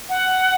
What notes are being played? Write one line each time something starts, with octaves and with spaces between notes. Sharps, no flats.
F#5